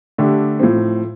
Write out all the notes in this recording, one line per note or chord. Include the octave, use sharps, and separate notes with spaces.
D3 A3 D4 G4
A2 F3 C4